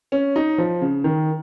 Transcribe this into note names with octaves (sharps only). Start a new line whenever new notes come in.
C#4
D#4
F3
C#3
D#3